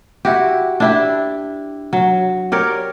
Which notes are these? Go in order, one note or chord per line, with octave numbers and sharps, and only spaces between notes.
E4 F#4 G4
D4 E4 G4
F#3
G4 A#4 C#5 D5